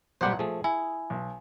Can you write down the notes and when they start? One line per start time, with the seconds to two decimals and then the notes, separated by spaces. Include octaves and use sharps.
0.21 B1 A#2 G3 G4 C5 F#5
0.39 F3 A3 G#4
0.64 E4 G#5
1.10 B1